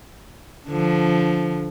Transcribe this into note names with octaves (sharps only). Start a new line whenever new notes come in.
D3 F3